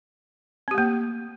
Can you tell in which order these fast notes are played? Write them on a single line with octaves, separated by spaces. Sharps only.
C4 G4 A3 A#3